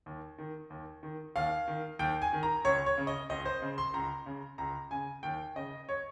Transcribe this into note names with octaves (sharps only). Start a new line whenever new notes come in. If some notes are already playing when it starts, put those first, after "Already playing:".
D#2
D#3
D#2
D#3
D#2 F5
D#3
D#2 G5
G#5
D#3
A#5
C#2 C#5
C#5
C#3
D#5
C#2 D#5
C5
C#3
C6
C#2 A#5
C#3
C#2 A#5
C#3 G#5
D#2 G5
C#3 D#5
C#5